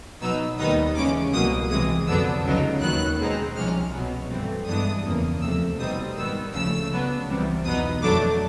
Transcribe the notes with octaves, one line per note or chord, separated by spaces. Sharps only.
B2 F#3 B3 D#4 E6
D#2 D#3 G3 B3 D#4 D#6
C#3 E3 G#3 C#4 D6
C2 B2 F#3 A#3 D#6
C3 E3 G#3 D#6
F2 D3 F#3 B3 D4 E6
C#2 C#3 F#3 B3 D#4
D#2 D#3 F#3 B3 F#6
B2 G#3 C4 D#4
C2 C3 F3 G#3 C#4 F6
B2 F#3 B3
G2 E3 A3 C4
G2 E3 G#3 B3 D4 D#6
E2 C#3 F3 A#3
D2 C3 F3 A3 E6
B2 G3 C4 D#4 D#6
G#2 D#3 G3 B3 E6
D2 C#3 F3 A3 E6
C#3 F#3 B3 D4
C2 C3 E3 G3
E2 B2 F#3 B3 D#4 D#6
F2 D3 F#3 A3 D4 D6